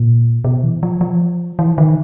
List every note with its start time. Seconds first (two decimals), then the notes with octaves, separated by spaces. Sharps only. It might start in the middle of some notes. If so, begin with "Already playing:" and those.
Already playing: A#2
0.44 B2
0.64 E3
0.83 F3
1.01 F3
1.59 E3
1.78 D#3